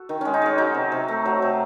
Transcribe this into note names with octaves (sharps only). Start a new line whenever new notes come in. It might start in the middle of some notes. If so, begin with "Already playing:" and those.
Already playing: F#4 A4
D#3
G#3 C#4
D#4
G#3 C#4
F#3 D#4
C3
C3
A3
F#3
C3